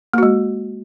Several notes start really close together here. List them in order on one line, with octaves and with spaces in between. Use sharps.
A#3 F#4 G#3